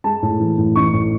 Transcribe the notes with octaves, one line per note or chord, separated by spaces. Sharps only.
G#3 A5
A2
E3
A2
A1 C#6
A2